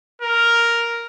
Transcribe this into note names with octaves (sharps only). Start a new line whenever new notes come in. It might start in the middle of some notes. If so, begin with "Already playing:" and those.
A#4